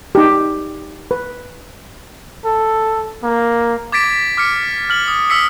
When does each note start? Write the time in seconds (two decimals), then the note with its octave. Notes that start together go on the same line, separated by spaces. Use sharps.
0.15 D#4 G4
1.11 B4
2.45 A4
3.23 A#3
3.92 D6 G#6 A6 B6 D7
4.37 D6 F6 B6 C#7
4.90 F6 F#7
5.08 D#6
5.30 D#6 E6 B6 C#7